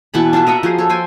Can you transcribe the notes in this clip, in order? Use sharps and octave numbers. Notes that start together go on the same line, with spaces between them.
B2 E3 A5 B5
D4 F4 A4 E5
A#4 D#5 E5 F#5
F3 F#4 G#4 C5
A4 C#5
C5 G5 G#5